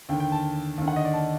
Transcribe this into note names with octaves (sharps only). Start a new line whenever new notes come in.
D#2 D3 G5
G5
A5
D#2 D3
F#5
D#5
D5
A5